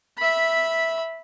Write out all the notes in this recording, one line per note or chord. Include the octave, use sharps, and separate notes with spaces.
E5 B5